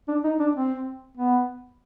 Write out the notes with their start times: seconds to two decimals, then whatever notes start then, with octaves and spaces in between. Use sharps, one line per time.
0.08 D4
0.24 D#4
0.40 D4
0.55 C4
1.17 B3